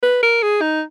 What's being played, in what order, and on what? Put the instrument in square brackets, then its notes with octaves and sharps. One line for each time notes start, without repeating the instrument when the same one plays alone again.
[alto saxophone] B4
A#4
G#4
D#4